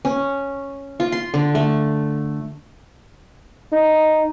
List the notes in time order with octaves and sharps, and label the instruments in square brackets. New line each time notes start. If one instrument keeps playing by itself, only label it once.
[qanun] C#4
F4
C6
D3
A3
[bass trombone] D#4